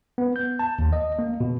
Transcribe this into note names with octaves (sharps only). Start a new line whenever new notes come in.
B3
G6
A5
D#2
D#5
A#3
B2